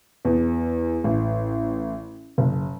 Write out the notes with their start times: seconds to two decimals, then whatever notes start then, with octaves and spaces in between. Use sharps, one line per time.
0.25 E2
1.04 A1
2.38 F#1